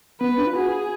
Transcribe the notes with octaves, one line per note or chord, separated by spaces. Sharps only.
B3 B4
D4
F4
F#4 G#4